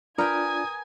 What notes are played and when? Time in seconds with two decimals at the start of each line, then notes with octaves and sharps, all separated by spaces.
0.18 D4 F4 A#4 B4 D5 G5 G#5 D#6